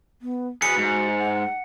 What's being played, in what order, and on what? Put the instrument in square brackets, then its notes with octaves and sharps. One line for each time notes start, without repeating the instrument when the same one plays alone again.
[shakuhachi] B3
[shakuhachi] F#4 [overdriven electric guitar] G#4 B4 [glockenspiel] C#7
[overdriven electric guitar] G#2
[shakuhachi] F#5